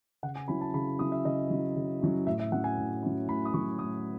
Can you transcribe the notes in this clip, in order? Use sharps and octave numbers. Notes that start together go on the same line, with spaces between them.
C#3 F#5
G#5
F#3 C#4 E4 B5
A5
C#3 B5
F#3 C#4 E4 D#6
E5
C#3 D#5
F#3 C#4 E4
C#3
F#3 C#4 E4
A2 E5
E5
F#3 C#4 E4 F#5
G#5
A2
F#3 C#4 E4
A2 B5
D#6
F#3 C#4 E4 C#6
A2 D#6